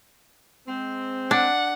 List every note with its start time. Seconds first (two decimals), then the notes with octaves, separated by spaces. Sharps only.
0.68 G#3 C4
1.31 D4 F#5